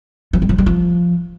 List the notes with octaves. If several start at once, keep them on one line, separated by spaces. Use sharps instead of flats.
F3
G3
F3
G3
F3